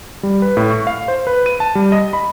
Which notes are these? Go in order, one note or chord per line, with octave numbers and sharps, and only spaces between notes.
G3
B4
A2
C#6
F5
C5
B4
D#7
A5
G3
D#5
B5